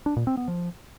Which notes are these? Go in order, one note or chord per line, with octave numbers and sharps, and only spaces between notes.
D4
A#2
C4
B3
F3